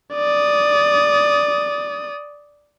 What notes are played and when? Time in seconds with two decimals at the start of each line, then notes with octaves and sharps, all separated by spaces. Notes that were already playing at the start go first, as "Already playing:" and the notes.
0.14 D5 D#6